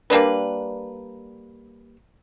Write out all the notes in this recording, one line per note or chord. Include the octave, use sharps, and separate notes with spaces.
G3 A#3 D4 B4